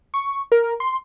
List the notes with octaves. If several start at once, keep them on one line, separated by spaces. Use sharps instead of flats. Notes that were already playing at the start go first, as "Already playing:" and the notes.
C#6
A#4
C6